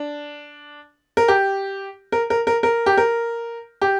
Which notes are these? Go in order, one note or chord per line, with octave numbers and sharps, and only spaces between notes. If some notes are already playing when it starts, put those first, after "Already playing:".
Already playing: D4
A#4
G4
A#4
A#4
A#4
A#4
G4
A#4
G4